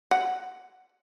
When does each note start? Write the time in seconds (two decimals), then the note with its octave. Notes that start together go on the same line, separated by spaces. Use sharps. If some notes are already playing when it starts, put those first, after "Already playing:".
0.11 F#5